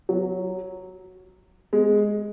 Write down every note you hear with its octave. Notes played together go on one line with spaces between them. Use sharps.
F#3
G#3